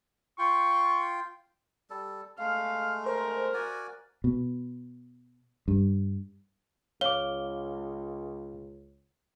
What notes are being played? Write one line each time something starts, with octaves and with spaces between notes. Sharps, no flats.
F4 G5 C6 C#6
G3 A4
G#3 A3 F5
A#4 C5
F#4 D5 G#5
B2
G2
C#2 C#5 F5 D6 G7